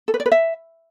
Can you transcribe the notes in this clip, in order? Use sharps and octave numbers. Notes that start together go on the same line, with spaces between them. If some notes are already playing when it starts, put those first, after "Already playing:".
A4
B4
D5
B4
E5